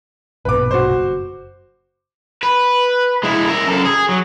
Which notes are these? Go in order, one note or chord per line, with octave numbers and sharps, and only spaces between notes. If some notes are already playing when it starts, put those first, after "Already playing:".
A#1 G2 B2 B4 D6
F#4 C5
F#1
B4
G#3 E4
A#4 E5
F#2 A4
G#4
F#3